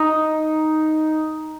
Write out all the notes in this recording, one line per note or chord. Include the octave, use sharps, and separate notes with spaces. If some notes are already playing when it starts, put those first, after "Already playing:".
Already playing: D#4